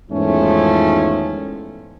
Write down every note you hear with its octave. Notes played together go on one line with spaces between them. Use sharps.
E2 G#2 D#3 F3 A3 C#4